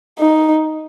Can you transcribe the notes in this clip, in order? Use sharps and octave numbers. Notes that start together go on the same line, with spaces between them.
D#4